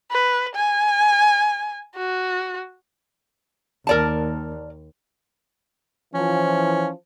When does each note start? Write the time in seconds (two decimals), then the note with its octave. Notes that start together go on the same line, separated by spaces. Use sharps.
0.11 B4
0.55 G#5
1.96 F#4
3.87 D#2 A#4 D5 A5
6.14 E3 F3 C#4